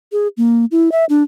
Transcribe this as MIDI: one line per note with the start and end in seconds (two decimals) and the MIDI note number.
0.12 0.28 68
0.37 0.65 58
0.71 0.92 64
0.92 1.05 76
1.09 1.23 62